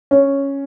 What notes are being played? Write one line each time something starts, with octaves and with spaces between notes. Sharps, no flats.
C#4